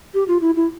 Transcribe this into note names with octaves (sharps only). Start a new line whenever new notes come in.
G4
F4
E4
E4